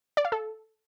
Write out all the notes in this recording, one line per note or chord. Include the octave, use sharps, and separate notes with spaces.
D5
F5
A4